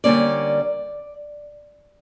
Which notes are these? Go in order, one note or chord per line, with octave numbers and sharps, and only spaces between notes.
D3 G3 A#3 C#4 D5